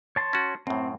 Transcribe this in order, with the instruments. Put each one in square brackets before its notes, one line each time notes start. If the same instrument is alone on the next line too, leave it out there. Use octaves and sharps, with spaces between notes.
[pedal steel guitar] C#5 A5 C6
[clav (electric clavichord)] C#4 F#4
[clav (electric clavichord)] F#2 A2 [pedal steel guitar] C4